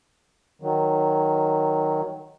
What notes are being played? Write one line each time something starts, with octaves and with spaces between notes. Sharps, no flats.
D#3 F#3